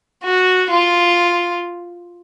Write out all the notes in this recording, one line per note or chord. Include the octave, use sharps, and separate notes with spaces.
F#4
F4